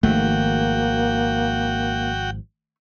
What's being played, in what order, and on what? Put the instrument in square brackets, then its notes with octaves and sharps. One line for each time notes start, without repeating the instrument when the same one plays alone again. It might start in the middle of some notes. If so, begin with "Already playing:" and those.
[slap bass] G#1 F3 [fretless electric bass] D#3 A3 [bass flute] A#3 [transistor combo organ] F#4 G5